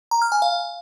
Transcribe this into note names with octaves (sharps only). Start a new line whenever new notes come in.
A#5
F6
G#5
F5